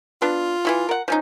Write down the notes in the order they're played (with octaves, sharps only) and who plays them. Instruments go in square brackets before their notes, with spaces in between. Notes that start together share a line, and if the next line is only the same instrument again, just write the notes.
[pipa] B3 D4 [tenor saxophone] F4
[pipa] E3 E4 F#4
A#4 F#5
F3 C#4 D#4